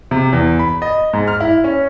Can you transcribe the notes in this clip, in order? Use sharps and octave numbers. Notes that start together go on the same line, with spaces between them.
C3
E2
B5
D#5
G#2
F6
E4
C#4